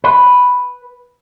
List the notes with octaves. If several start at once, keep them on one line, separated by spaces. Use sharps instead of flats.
B4